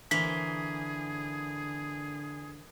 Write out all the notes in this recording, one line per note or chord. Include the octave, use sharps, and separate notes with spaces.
D3 E3 A#3 G#4 C5 B6